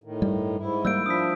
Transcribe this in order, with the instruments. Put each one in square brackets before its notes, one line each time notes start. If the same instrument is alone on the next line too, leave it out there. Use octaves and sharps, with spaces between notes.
[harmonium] A2 D#3
[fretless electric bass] G2 G3
[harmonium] G#2 E4
[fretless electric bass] G3 A#3 [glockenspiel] E6 G6 D7
[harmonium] F3 D4 E4 [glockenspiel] D#6 B6